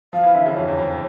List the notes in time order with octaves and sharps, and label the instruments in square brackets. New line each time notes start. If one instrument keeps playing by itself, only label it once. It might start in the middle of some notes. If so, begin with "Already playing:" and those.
[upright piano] F3 [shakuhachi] F5
[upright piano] E3
[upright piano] D3 [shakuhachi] E5
[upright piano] C#3
[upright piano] F2 [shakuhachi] C#5
[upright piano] E2
F2